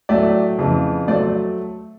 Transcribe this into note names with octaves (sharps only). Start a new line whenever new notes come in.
A2 F#3 A3 D5 E5
F2 C#3 E3
F#3 A3 C5 D5